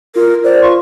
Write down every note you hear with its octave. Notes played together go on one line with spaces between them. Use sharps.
F4 A#4
C5 D5
F4 C#6